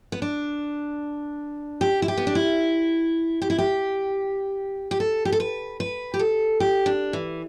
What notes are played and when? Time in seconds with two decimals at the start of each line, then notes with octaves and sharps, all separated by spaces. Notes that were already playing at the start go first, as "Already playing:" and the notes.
0.12 B3
0.22 D4
1.81 G4
2.02 E4
2.08 G4
2.17 B3
2.27 D4
2.35 E4
3.42 G4
3.50 E4
3.58 G4
4.91 G4
5.00 A4
5.25 G4
5.32 A4
5.40 B4
5.80 B4
6.14 G4
6.19 A4
6.60 G4
6.86 D4
7.13 E3